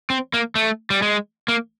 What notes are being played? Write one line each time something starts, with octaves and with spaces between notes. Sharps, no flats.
C4
A#3
A3
G3
G#3
A#3